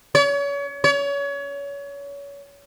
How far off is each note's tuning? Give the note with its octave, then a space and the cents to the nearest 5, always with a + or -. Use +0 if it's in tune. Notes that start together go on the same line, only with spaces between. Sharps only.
C#5 +35
C#5 +30